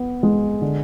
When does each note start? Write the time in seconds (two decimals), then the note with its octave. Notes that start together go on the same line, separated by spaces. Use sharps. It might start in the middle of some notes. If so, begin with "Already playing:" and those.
Already playing: B3
0.23 G#3
0.61 D3